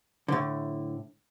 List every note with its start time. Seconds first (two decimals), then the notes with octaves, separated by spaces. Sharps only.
0.28 A2 D3